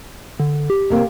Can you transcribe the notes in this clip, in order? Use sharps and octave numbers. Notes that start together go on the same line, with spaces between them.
D3
G4
C3 A#3 C4